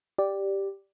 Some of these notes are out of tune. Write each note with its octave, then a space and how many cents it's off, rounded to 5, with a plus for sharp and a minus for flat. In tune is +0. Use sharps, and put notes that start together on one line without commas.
G4 +0 D5 +0